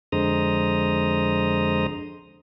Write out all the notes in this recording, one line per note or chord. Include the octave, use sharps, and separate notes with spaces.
F2 D3 G#3 C5 A#5 D#6